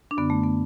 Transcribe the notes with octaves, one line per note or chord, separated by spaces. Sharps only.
D4
F#2 D3 B3
A3
B3